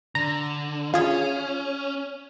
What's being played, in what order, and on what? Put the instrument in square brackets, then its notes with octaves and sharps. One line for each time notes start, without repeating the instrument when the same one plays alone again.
[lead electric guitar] D3 [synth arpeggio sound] A#5
[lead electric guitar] C#4 [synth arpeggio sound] F4 G#4